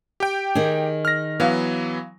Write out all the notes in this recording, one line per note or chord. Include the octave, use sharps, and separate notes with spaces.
G4 G5
D#3 G#4
F6 A#6
E3 F#3 B3 F5